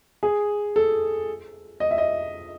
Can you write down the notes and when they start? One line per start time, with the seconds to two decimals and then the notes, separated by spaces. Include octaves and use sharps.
0.23 G#4
0.76 A4
1.80 D#5
1.91 E5
1.98 D#5